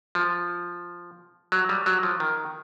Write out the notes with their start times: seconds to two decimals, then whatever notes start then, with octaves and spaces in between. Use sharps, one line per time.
0.15 F3
1.52 F#3
1.69 G3
1.86 F#3
2.03 F3
2.20 D#3